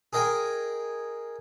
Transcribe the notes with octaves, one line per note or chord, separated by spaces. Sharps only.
G#4 A#4 D#5 G5 G#5